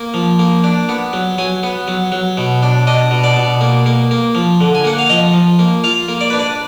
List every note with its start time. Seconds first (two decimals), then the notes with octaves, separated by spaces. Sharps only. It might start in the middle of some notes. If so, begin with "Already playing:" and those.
Already playing: A#3
0.14 F3
0.39 A#3
0.64 D4
0.89 B3
1.13 F#3
1.38 F#3 G#5
1.63 B3
1.88 F#3
2.12 F#3
2.37 B2
2.63 D4
2.87 D4 D#5
3.11 B2
3.24 D5
3.36 B2
3.61 A#3
3.86 A#3
4.11 A#3
4.35 F3
4.61 D3
4.75 G#5
4.84 A#3 F#5
4.99 F5
5.09 F3 D#5
5.34 F3
5.59 A#3
5.84 F4 F5
6.09 A#3
6.21 D5
6.30 D4 B4
6.39 D5